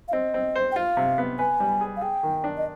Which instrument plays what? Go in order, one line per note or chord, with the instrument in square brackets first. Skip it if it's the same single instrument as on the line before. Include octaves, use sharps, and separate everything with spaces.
[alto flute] F5
[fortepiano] C4 [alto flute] D#5
[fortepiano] C4
C5
[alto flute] G5
[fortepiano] F4 [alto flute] F5
[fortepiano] C3
B3
[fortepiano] B4 [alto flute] G#5
[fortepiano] G3
G#4
[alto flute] F5
[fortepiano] G#4 [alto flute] G5
[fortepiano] D#3
D4
[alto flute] D#5